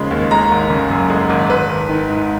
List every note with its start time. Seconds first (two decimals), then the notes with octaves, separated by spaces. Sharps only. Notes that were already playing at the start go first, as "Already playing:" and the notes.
Already playing: D#2 C#3 F3 G#3
0.11 D#2
0.31 G#3 A#5
0.51 G#1
0.70 C#3
0.90 F#2
1.10 G#3
1.30 G#1
1.50 G#1 B4
1.69 G#1
1.89 D#3
2.09 G#2